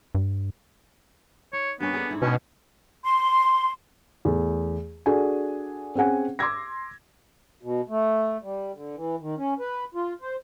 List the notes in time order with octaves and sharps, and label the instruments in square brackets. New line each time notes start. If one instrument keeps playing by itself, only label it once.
[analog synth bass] G2
[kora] D#4 [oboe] C#5
[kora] G2 A#3 C#4 [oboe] B3
[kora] G#4 A4 D5
G#2 E4 E5
[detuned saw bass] B2 [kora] C4 D#4 [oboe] C#4
[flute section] C6
[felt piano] E2 A3
D4 F#4 G#4 A4 G#5
C4 C#4 G#4 F#5 G#5
C6 D6 E6 G#6 A#6
[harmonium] B2
A3
G3
D3
E3
D#3
C#4
B4
F4
C5